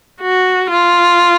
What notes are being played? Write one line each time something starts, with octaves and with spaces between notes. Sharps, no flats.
F#4
F4